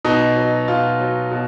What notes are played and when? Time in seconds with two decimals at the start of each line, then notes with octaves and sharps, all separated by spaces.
0.05 B2 D#4
0.36 F#3
0.68 B2 F4
1.00 F#3
1.31 B2